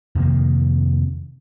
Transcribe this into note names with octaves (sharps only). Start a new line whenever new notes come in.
F2 C3 D#3 A#3